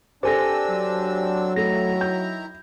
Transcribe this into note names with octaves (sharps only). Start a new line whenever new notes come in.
C4 D4 G4 A4 C5 G#5 E6 A#6
F#3
D#3 A3 E4 A#5 A#6
G6